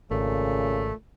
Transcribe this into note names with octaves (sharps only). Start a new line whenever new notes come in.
G#1 A#2 C#3 A3